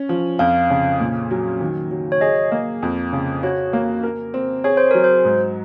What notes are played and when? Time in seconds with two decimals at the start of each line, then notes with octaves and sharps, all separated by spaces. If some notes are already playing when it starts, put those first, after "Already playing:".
Already playing: C#4
0.09 F3
0.39 F2 F5
0.70 C#3
1.00 A#2
1.31 F#3
1.61 D#3
1.91 F#3
2.12 C#5
2.21 G#4 D#5
2.52 A#3
2.83 F2
3.13 C#3
3.43 F#4 C#5
3.73 A#3
4.04 A#4
4.34 C4
4.64 G#4 C#5
4.77 C5
4.91 F#3 A#4
5.04 C5
5.25 G#2